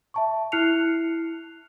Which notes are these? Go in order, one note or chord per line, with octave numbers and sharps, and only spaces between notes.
E5 A5 C#6
E4 F6 F#6 C7 C#7 F7